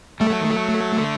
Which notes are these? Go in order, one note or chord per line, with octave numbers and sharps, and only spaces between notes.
G3 A3
F#3
D#3
F#3
D3